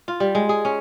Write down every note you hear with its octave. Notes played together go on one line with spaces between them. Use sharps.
F4
G3
G#3
G#4
C#4